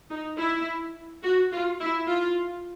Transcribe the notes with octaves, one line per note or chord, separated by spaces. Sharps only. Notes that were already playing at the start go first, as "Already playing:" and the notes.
D#4
E4
F#4
F4
E4
F4